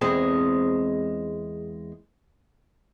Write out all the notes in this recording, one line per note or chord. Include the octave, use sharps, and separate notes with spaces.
E2 G#3 C4